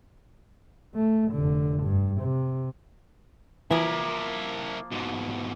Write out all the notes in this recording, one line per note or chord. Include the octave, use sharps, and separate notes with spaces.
A3
F1 D3
G2
C3
E3 F3 A#3 E4 A#4
G#2 B2